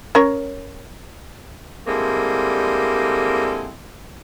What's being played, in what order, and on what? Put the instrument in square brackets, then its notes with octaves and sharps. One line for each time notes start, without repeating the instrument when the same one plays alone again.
[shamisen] C#4 A#4 C#5
[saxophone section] D3 G3 G#3 A#3 C4 E4